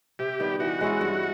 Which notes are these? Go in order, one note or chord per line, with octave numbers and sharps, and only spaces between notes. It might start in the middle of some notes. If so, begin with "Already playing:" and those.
C3 G4
D#3 G3 B3
E3 F#4
G#3 C#4 E4
G2